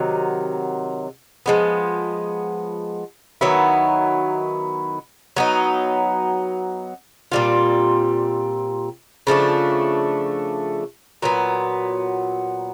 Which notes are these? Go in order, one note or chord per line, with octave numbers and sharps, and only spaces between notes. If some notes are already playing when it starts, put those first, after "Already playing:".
Already playing: C3 D#3 F#3
F3 G#3 B3
D#3 F#3 B3 E4
F#3 B3 D#4
A#2 G3 C4 F4
C#3 F3 A3 D4
A#2 F#3 B3